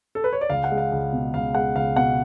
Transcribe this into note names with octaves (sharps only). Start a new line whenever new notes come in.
A4
B4
C#5
D5
C#2 F5
F#5
G#3
F5
C#2
B2
C#2 F5
G#3 F#5
C#2 F5
B2 F#5